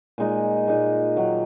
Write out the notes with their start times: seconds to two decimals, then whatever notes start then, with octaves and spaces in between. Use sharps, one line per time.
0.18 A#2 G#3 D#4 G#4
0.67 A#2 G#3 D#4 G#4
1.16 D#3 F#3 A#3